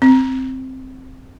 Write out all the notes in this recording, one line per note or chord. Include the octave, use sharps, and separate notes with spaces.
C4